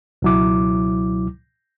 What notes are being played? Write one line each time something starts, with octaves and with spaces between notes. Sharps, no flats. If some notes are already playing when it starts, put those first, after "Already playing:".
C#2 B2 F#3 E4 D6